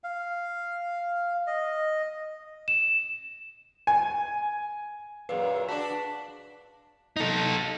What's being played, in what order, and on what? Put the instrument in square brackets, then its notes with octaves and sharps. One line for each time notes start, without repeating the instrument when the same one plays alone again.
[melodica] F5
D#5
[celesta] E7
[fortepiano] G#5
[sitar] F#2 A#2 [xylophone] G#4 F5 [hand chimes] B4
[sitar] D4 F#4 [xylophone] A5 E7 [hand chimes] B6
[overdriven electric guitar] D#4 A4